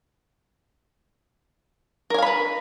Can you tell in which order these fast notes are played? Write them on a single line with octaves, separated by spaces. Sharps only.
A#4 G#5 F5 B5 B4